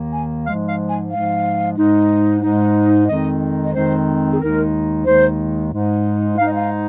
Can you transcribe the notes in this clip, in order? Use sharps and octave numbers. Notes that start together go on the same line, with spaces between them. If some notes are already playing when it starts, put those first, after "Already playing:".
Already playing: D#2 D#3 A#3
G#5
G#2 F3 G#3 F5
F5
G#5
G#2 F3 G#3 F5
G#2 G#3 D#4
G#2 G#3 D#4
F2 D#3 G#3 C4 D#4 D#5
D#5
F2 D#3 G#3 C4 D#4 C5
G#4
D#2 D#3 G#3 D#4 A#4
D#2 D#3 G#3 D#4 C5
G#2 G#3 D#4
G#2 G#3 D#4 F5
D#5
F5